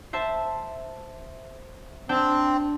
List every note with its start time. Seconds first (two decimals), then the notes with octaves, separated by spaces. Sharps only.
0.13 C5 E5 A5
2.09 C4 D4 G5 A5